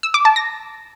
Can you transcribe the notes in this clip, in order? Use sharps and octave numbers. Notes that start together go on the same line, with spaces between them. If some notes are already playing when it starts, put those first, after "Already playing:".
E6
D6
A5
A#6